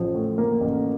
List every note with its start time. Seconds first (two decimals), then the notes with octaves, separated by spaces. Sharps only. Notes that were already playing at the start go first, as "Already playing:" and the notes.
Already playing: A1 F3
0.14 A2
0.38 A#3
0.61 A1